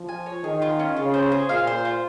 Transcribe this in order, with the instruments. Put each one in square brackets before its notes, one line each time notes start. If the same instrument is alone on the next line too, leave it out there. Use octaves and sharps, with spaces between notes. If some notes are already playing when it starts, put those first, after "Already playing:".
Already playing: [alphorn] F3
[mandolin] G#5
C#5
[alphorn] D#3 [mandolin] G#4
[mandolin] F4
C#4
[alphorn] C#3 [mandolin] F4
[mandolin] C5
G#4
[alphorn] A#2 [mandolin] F5
[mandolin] C5
F4